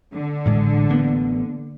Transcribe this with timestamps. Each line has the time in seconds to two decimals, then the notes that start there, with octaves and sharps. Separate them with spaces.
0.14 D3
0.46 A1 A2 G#3
0.89 A1 A#3 B3